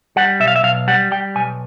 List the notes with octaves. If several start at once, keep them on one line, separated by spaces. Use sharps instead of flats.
G3 F#5
B1 E5
F5
E5
B1 F5
G3 F#5
G3 G5
B1 G#5